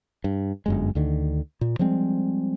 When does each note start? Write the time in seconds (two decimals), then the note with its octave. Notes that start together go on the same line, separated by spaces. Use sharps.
0.24 G2
0.66 G1 F#2 G#3
0.95 D2 D3 D#3
1.61 A#2
1.79 F3 G3 G#3 C4